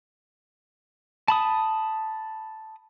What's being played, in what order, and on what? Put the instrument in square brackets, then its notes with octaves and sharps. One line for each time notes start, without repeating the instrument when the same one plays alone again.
[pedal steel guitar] A5 B5 D#6